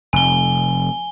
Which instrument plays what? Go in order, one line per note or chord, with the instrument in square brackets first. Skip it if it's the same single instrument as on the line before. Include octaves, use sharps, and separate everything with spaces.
[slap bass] F1 [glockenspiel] G#5 G7